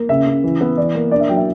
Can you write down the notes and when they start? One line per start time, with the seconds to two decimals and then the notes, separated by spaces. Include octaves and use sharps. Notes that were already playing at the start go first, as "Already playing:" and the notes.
Already playing: A#3
0.09 C#3 E5
0.26 C#3
0.44 E3
0.61 B3
0.77 E3 D5
0.95 A#3
1.11 D4 D5
1.20 E5
1.29 F#3 G5
1.37 E5